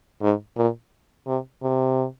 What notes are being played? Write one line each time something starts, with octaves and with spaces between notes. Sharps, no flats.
G#2
A#2
C3
C3